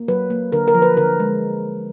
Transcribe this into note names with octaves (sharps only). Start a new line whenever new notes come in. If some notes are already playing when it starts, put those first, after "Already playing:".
Already playing: A#3
F#3 B4
A#3
D3 A#4
A#4
F3
B4
D3 A#4
G#3